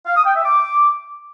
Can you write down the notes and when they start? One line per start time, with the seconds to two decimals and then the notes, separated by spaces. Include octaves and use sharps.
0.06 F5
0.16 D#6
0.25 G5
0.35 E5
0.44 D6